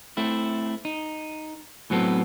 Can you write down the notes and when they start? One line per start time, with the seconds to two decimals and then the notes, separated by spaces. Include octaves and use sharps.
0.17 A3 C4 E4
0.85 D#4
1.90 A2 F#3 B3 C4 G#4 A4